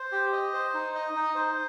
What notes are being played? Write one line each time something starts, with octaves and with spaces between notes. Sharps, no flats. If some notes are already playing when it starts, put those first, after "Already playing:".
Already playing: C5
G4
D#5
C5
D#4
D#5
D#4
C5